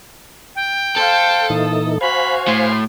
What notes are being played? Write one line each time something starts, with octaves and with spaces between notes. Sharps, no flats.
G5
A4 C5 F5
A#2 E3 D#4 D#6
F#4 C5 F5 G#5 B5
A2 C6